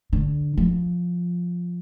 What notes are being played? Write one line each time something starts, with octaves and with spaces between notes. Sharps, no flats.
D3
F3